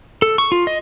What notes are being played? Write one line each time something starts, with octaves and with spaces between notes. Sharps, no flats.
A4
C#6
F4
D#5